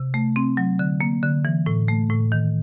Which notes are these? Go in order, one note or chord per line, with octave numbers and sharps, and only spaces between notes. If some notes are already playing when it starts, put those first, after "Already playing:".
Already playing: C3
A3
C4
F#3
D3
A#3
D3
E3
A2
A3
A2
D#3